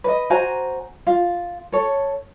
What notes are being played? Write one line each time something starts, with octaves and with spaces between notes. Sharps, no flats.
B4 D#5
F#4 C5 G#5 A#5
F4
A4 C#5